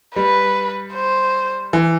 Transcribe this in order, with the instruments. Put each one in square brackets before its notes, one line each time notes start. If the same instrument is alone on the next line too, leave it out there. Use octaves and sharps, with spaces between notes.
[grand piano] G3 [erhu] B4
[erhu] C5
[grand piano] E3